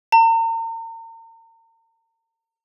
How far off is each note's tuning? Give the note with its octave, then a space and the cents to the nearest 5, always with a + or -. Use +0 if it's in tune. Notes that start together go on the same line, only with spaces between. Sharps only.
A#5 -40